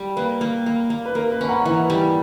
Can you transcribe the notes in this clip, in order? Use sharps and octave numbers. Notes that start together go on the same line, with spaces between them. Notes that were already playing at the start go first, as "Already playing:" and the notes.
Already playing: G3
A#3 B4
A#3
A#3
A#3
B4
A#3 A#4
B4
C#4 B5
F#5 A#5
E3 F#5 A#5
G3